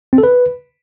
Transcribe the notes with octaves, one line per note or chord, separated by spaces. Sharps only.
C4
A4
B4